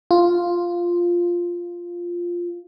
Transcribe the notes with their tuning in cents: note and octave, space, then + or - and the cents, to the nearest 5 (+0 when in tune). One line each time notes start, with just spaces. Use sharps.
F4 +0